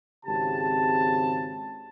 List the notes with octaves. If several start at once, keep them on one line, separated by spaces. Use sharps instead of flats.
G#1 C#3 C4 G4 A5